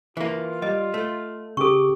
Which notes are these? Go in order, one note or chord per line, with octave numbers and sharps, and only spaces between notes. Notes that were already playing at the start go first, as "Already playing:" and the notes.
E3 A#3 F4
G3 D#5
A3
C#3 G4 A4 C#6 D6